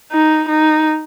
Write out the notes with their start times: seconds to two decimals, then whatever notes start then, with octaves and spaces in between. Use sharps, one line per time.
0.12 D#4
0.48 D#4